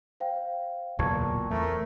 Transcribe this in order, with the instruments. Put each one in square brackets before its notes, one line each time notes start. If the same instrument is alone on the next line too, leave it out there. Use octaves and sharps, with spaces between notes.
[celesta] C5 F5 G5
[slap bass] D1 B1 E2 [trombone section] A#2 [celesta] A5 C#6 G#6
[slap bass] E2 [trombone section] A3 C4 A#4